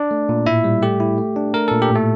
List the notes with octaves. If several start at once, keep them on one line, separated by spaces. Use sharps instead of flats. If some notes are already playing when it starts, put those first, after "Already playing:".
Already playing: D4 D5
A3
A#2
A2 E4 E5
G3
A3 G4
E4
A3
D4
A3 A#4
A#2 A4
G4
A2
A3 A4